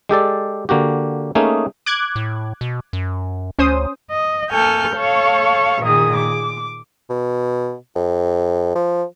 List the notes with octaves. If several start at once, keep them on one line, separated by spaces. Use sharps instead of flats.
G#3 G4 A4 D5
D3 A#3 F#4 G4
A3 A#3 C#4 D#4 G#4
D6 F#6 G#6
A2
B2
F#2
D2 C#4 C5 D#6
D#5
A#3 A4 G#5 C#6 F6 G6
A4 C#5 F5 C#6
A#2 D#3 G#4 D#6
D6
B2
F2
F3